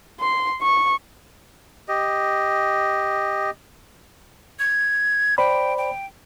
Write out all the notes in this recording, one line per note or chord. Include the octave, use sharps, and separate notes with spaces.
C6
C#6
G4 D#5
G#6
C5 D5 G5 B5
G5